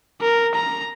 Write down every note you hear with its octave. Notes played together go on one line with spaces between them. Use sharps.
A#4
A#5